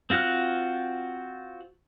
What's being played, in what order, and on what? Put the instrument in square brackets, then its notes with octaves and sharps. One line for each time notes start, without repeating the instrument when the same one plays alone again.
[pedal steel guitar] C4 F4 F#4 F6 F#6